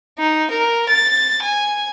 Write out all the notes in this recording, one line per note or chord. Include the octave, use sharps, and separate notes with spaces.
D#4
A#4
A6
G#5